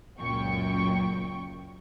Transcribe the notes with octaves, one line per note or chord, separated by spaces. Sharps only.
C#2 F#2 A#2 G5 C#6